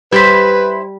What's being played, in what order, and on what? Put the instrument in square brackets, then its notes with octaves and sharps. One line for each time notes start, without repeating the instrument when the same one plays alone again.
[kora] G3 [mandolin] E4 C5 B5 [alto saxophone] B4